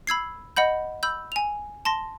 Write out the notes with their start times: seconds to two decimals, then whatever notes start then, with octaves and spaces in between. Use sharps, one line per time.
0.07 B5 E6 G#6 C7
0.56 D#5 F#5 B5 G6
1.03 B5 E6 G6
1.32 G#5 F7
1.85 A5 C6 A#6